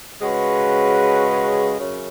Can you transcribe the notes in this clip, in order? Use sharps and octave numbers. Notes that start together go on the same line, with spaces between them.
C#3 G#3 C#4 F#4 B4
F#2 C#3